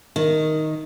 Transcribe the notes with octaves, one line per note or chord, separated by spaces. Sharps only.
D#3